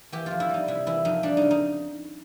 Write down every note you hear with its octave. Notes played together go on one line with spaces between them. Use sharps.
E3 G4
F2 F4
E4
G3 D#4
C3 E4
E3 E4
F2 D#4
G3 D4
C#3 D#4
D#4